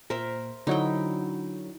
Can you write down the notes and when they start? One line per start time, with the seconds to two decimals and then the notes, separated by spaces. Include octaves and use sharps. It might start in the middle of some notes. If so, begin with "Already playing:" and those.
0.10 A#2 A#4 C5 E5
0.67 D3 F#3 D#4 E4 G5